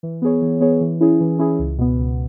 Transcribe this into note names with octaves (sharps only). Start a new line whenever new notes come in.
E3
B3 G#4 C#5
E3
B3 G#4 C#5
E3
C#4 E4 G#4
E3
C#4 E4 G#4
C#2
B2 B3
C#2